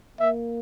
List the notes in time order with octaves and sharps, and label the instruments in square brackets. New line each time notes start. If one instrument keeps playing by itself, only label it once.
[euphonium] A#3 [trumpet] E5